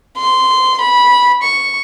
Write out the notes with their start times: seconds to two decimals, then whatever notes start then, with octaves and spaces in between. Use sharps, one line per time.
0.17 C6
0.80 B5
1.42 C#6